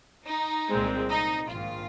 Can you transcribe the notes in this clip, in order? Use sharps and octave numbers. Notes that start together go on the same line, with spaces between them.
D#4
C2 A#2 G#3 C4
D#4
A#1 G#2 D#3 F4